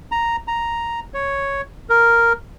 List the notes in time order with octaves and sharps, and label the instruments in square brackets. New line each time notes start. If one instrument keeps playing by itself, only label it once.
[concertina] A#5
A#5
C#5
A#4